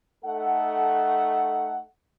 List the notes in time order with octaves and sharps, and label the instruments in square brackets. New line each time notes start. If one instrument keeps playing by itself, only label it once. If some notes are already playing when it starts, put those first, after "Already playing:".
[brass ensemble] A3 D#4 A4 F#5